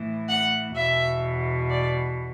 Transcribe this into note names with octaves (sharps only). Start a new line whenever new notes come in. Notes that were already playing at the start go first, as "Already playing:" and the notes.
Already playing: A2 E3
F#5
E2 B2 E5
D5